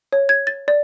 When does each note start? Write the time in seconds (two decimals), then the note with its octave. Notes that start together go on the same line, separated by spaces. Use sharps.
0.13 C#5
0.29 G#6
0.47 A6
0.68 D5